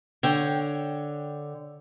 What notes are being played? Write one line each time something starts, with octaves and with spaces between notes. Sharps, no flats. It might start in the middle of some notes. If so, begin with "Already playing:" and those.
D3 C#5 G5